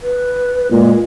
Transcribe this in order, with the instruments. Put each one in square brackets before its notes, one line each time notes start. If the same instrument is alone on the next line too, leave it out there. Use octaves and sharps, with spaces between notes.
[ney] B4
[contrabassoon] A#2 [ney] G#3